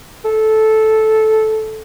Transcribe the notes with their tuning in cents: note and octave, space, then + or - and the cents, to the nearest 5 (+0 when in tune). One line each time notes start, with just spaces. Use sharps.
A4 -10